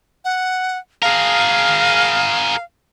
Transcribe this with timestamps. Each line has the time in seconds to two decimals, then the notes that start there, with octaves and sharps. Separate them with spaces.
0.25 F#5
1.02 G#4 A#4 F5